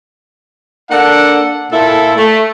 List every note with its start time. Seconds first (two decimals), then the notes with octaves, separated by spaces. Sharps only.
0.90 A#3 D4 A4 F#5
1.71 A#2 E4 A4
2.17 A3